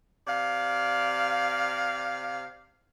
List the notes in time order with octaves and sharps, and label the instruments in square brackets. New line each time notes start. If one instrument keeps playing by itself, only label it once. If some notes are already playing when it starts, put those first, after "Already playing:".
[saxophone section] C3 D5 F5